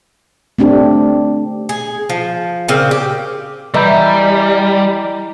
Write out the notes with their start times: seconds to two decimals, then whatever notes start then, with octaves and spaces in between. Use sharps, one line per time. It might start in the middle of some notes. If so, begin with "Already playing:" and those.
0.58 A3 C4 D4 G4
1.69 G#4
2.09 F3
2.68 A#2 C#3 C4
2.91 G4
3.74 E3 G3 D#5 A#5 G6